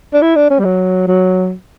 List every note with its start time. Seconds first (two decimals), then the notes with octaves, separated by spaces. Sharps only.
0.14 D4
0.22 E4
0.36 D4
0.50 C#4
0.59 G3
0.65 F#3
1.07 F#3